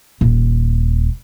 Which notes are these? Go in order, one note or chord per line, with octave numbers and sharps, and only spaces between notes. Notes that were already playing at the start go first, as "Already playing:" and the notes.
D#1